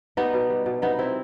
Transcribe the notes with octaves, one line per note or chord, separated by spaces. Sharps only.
G3 B3 D#4
B2
G3
B2
C3 B3 D#4
C3 C4 E4